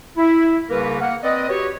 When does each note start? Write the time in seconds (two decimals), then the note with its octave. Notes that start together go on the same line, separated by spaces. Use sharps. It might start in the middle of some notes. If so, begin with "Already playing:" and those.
0.17 E4
0.70 C2 C#3 A#3 A#4 B4
1.00 A#3 F#5
1.23 C4 B4 D5 D#5
1.49 F#4 G4 B4 C#5